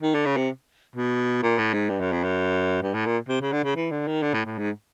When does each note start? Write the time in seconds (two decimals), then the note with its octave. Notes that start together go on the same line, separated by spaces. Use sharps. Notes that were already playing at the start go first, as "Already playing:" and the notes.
0.02 D#3
0.14 D3
0.26 C#3
0.37 C3
0.96 B2
1.43 A#2
1.58 A2
1.73 G#2
1.90 G2
2.00 F#2
2.12 F2
2.24 F#2
2.82 G2
2.94 A2
3.06 A#2
3.29 C3
3.41 C#3
3.53 D3
3.64 C#3
3.76 E3
3.91 D3
4.07 D#3
4.22 D3
4.34 A2
4.45 A2
4.58 G#2